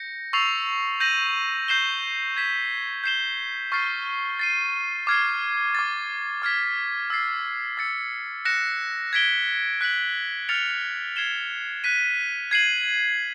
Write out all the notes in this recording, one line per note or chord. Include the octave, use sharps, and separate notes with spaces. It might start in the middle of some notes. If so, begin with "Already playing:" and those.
Already playing: G6 A#6 C#7
C#6 E6 A6 C7 F7
G6 A#6 D#7 F#7
G6 C7 E7 G7
G#6 B6 E7
G6 C7 E7 G7
C#6 F6 A6 C7
A6 C7 D#7
D6 F6 G#6 C7
D6 F6 A6
D6 F6 G#6 B6
E6 A6 C7
E6 A6 C#7
F#6 A#6 C#7 E7
G#6 B6 D7 G7
F#6 B6 D7 F#7
F6 A6 C#7 F7
G#6 C7 E7 G7
F#6 B6 D#7
G#6 C7 D#7 F#7